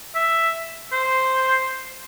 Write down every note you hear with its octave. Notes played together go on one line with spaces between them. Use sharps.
E5
C5